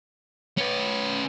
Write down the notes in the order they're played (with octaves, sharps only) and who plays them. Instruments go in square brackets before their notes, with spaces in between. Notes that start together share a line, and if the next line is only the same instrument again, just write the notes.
[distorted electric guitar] C#4 B4